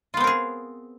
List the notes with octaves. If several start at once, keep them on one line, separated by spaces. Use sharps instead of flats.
B3 C4 F4 G#4 A#4